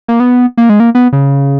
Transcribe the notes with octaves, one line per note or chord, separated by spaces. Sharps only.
A#3
B3
A#3
G#3
A#3
B3
C#3